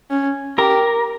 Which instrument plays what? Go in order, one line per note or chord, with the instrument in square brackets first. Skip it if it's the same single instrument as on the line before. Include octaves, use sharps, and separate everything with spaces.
[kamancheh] C#4
[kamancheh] G4 [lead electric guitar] A#4